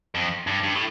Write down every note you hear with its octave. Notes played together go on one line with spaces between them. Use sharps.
F2
G2
G2
A2